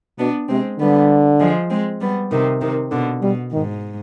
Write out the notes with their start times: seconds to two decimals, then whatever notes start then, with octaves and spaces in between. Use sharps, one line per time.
0.19 B2 B3 D4
0.49 C3 G#3 C4
0.79 D3 G3 B3
1.40 F3 G#3
1.70 G#3 C4
2.01 G3 B3
2.31 C3 D#3
2.61 C3 D#3
2.92 B2 D3
3.22 B2 G3
3.52 G#2 D#3